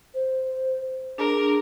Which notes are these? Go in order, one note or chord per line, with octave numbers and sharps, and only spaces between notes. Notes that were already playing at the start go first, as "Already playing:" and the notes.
C5
D4 G#4 A#4